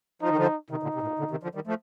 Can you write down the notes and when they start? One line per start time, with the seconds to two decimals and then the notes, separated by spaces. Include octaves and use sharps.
0.22 F3 D#4
0.30 D#3
0.37 D3 F3
0.71 C3 D#3 D#4
0.83 A#2 D3
0.94 C3
1.02 A2
1.07 A#2
1.19 A#2 D3
1.31 C3 D#3
1.43 D3 F3
1.55 D#3 G3
1.67 F3 A3